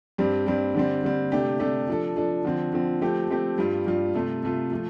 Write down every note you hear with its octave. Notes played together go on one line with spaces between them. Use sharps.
G2 G3 C4
G2 G3 C4
D3 G3 C4
D3 G3 C4
C3 A3 D4 G4
C3 A3 D4 G4
F3 D4 A4
F3 D4 A4
D3 F3 C4
D3 F3 C4
F3 A3 C4 G4
F3 A3 C4 G4
G2 G3 F4
G2 G3 F4
C3 A3 F4
C3 A3 F4
F3 A3 F4